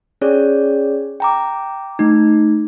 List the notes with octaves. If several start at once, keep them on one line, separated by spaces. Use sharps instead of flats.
C#4 G#4 C#5 D5
G5 A#5 D6
A3 D#4